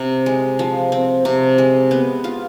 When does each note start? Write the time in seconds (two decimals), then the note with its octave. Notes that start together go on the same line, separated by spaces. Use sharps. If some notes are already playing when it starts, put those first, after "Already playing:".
Already playing: C3 C4
0.26 G#3
0.59 F3
0.92 C4
1.25 C3
1.58 G#3
1.91 B3
2.24 F4